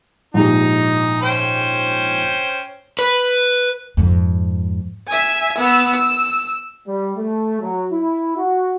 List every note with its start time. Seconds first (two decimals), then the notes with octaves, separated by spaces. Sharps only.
0.34 A#1 G#2 D#4 G4
1.22 C#4 C5 G5
2.99 B4
3.97 F2 G#2
5.07 E5 G#5
5.58 B3 E6
5.94 E6
6.86 G3
7.17 A3
7.61 F#3
7.92 E4
8.37 F#4